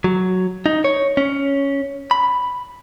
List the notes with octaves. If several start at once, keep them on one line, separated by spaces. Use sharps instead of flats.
F#3
D#4
C#5
C#4
B5